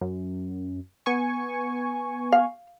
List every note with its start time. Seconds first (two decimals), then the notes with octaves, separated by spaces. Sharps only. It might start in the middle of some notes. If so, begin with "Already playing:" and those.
0.01 F#2
1.06 B3 G#5 C#6
2.32 F5